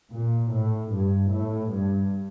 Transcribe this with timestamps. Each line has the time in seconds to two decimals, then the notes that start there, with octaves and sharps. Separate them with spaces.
0.13 A#2
0.53 A2
0.93 G2
1.32 A2
1.71 G2